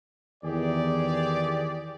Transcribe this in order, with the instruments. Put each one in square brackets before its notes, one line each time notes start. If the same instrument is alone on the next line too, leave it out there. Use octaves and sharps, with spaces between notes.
[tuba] E2 [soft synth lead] D#3 [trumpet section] G4 G#4 D5